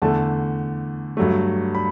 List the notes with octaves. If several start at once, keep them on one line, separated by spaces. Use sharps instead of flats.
E2 D3 A3 A5
G2 F#3 A3
B5